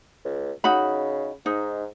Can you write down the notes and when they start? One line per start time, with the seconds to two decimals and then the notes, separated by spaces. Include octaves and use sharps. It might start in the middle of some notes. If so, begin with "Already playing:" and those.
0.25 C#2
0.64 C#3 D#4 F#4 B5
1.46 G#2 D#4